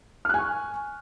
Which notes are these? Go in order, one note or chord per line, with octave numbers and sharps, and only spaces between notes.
G#5 C#6 F6 F#6